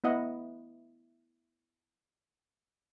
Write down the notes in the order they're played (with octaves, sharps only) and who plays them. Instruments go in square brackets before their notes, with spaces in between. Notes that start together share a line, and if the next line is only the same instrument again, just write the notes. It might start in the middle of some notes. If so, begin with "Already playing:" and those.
[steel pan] B3 E4 D#5 F#5